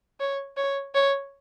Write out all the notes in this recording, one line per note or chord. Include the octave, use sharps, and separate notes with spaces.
C#5
C#5
C#5